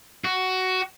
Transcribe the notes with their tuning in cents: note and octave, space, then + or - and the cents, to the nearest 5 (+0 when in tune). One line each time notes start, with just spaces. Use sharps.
F#4 +10